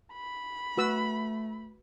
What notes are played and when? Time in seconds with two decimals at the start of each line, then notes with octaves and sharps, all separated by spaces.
0.13 B5
0.77 A3 F#4 B4 E6